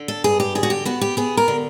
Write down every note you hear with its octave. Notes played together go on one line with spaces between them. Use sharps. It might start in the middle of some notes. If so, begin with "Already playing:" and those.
Already playing: D3
A4
G2 G#4
G4
D3 G#4
F#4
G4
B3 F#4
G4
B3 G#4
A#4
D3